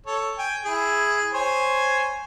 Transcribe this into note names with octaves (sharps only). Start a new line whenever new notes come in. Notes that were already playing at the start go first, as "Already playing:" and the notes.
A4 C#5
G5 G#5
E4 G#4
C5 C#5 G#5